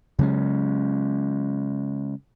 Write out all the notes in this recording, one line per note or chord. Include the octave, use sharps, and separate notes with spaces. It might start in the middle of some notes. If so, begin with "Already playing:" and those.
C#3 F#3 G#3 C#4